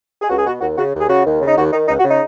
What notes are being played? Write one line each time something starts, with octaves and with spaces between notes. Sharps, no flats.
G#4
C#2 F#4
G#4
B2 F#4
D#2 F#4
C#3 F#4
D#2
G#4
C#3 F#4
D#2
C#3
D#4
D#2 F#4
D#3 D#4
C#2 D#4
F#4
C#3
D#4